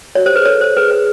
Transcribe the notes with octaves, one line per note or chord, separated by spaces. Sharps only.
F#4 C#5
G4 C5
G#4 B4
A4 C#5
C5
G#4 B4
B4